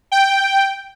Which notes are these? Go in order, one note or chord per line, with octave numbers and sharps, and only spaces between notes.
G5